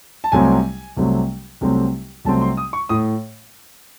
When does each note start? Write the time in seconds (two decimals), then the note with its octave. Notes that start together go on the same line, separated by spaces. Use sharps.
0.24 A5
0.32 C2 C3 F#3 A3 C4 G#5
0.97 C2 C3 F#3 A3 C4
1.61 C2 C3 F#3 A3 C4
2.25 C2 C3 F#3 A3 C4 A5
2.41 C6
2.57 D#6
2.73 C#6
2.89 A2 D#6